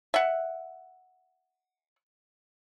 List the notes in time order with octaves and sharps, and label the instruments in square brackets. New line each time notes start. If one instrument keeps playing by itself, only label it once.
[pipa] E5 F#5